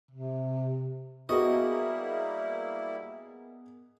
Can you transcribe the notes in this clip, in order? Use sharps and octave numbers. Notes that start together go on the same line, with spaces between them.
C3
G3 A#3 B3 E4 F#4 G#4 A#4 D#5